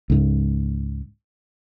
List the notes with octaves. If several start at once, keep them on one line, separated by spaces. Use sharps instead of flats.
C#2 G#2